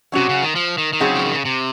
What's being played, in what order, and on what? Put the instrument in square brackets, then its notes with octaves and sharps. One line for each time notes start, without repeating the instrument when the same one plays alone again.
[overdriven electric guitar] C3 [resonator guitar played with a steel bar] F#3 C#4 F#4
[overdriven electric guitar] C#3
D#3
F3
D#3
D#3
[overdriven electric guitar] C#3 [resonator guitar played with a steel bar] F#3 C4 D#4 G#4
[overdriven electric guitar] F3
D#3
C#3
C3